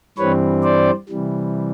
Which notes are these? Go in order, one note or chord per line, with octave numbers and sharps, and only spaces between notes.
G2 E3 G3 C4 B4 C#5
C5 D5
C3 E3 G3